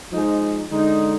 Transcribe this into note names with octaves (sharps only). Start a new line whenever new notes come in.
F3 G#3 D#4 G#4
D3 G#3 D#4